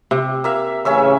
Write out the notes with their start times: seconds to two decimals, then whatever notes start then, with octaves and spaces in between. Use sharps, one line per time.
0.11 C3
0.44 A#3 E5 F5
0.85 A1 C#3 C#4 E5 E6